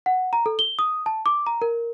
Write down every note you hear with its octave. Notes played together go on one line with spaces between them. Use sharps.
F#5
A#5
A4
G7
D#6
A5
D6
A#5
A#4